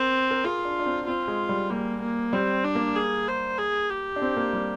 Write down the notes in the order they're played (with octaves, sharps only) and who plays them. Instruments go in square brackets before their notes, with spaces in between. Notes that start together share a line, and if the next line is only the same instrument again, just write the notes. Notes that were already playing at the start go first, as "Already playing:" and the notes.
Already playing: [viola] C4 [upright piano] A#4
[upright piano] A#4
[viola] F4 [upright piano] G#4
[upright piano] D4
D4
C4
[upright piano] C4 [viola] F4
[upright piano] G#3
G3
[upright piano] G3 [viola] A#3
[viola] A#3
[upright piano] G3 [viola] C4
[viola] D4
[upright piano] A#3
[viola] G#4
C5
G#4
G4
[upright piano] D4
C4
A#3
G3